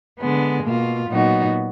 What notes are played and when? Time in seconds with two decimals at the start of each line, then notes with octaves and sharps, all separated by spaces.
0.17 D3 G#3 B3
0.63 B2 A#3 F4
1.08 A#2 F#3 B3 D#4 F#4